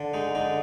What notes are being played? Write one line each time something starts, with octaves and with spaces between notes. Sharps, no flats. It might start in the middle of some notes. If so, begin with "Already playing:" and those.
Already playing: D3
G#3 D#4
D3 D#4